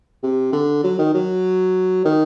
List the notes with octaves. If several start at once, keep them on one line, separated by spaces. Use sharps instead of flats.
C3
D3
F#3
D#3
F#3
D#3